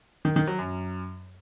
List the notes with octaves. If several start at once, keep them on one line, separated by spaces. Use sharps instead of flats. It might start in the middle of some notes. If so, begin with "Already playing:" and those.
D#3
D#3
F#3
F#2